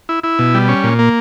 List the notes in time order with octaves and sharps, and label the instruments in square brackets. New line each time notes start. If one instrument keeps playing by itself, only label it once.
[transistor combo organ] E4
E4
B2
G3
C#4
A#2
A#3